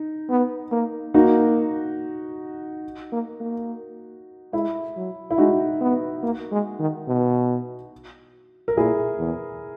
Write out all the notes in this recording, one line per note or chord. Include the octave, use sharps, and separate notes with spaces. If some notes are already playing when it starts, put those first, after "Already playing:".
Already playing: D#4
B3
A#3
A#3 D#4 F#4
A#3
A#3
G#3 E4
F#3
E4
G#3 D#4 F#4
B3
A#3
G#3
D#3
B2
A#4
A#2 E4 G#4
E2